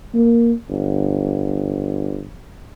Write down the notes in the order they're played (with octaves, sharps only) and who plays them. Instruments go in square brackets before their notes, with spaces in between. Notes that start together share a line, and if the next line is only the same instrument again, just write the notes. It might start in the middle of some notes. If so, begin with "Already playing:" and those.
[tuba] A#3
G1